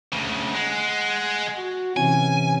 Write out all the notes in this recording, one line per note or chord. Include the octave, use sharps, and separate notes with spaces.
D2 C#3
G#3 F#5
F#4
C3 E3 C#4 G#5